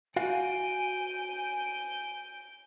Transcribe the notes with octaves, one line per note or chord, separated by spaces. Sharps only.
F#4 F5 G#5 G6 D7